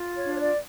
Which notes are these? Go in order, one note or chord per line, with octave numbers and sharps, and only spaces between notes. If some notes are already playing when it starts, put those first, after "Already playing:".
Already playing: F4
C#5
D4
C#5
D5